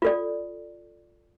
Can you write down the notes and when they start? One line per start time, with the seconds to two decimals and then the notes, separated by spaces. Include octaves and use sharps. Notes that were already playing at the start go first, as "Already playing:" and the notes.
0.02 F4 A4 D5